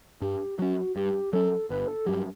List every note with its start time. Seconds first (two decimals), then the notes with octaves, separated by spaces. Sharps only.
0.21 G2 G4
0.59 F#3 C#4 F#4
0.96 G2 G4
1.33 F#3 C#4 A4
1.70 G1 B4
1.88 A4
2.06 G2 F#3 G4